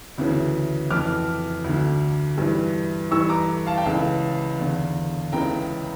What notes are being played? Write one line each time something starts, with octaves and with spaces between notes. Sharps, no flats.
D2 C#3 E3
F2 E3 D6 F6
D2
D3
G2 E3
G2 E3 C#6 E6
A#5 D6
F5 A5
G5
C#2 C#3 E3 F5 A5
E2 D3
C#2 C#3 E3 G5 A#5